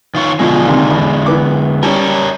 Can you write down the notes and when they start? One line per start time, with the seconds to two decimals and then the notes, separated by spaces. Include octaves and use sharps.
0.15 D#3 F4 C#5
0.39 B2 D3 F3 G#3
0.64 D#2 C3
0.90 A1 E2
1.26 E3 B3 D6
1.83 G3 C#4 A#4 C#5 A5